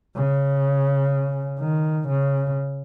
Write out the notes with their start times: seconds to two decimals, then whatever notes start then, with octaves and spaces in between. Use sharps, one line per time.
0.15 C#3
1.60 D#3
2.09 C#3